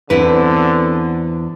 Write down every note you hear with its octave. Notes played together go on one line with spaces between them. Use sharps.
E2 D3 C4 D4 E4 B4